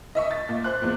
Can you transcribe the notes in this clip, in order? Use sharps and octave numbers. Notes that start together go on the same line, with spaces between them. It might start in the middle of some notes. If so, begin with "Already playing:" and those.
D#5 E5 C#6
A6
A#2
C5 F#6
E2 A#2